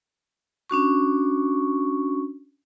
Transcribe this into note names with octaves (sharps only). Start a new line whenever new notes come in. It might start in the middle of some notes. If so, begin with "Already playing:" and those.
C#4 D4 F#4 C#6